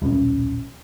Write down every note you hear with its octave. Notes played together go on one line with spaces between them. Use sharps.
D#1 B1 C#4